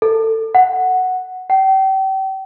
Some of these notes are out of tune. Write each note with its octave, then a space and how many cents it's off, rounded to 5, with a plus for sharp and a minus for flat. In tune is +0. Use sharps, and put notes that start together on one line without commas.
A4 +25
F#5 +0
G5 -35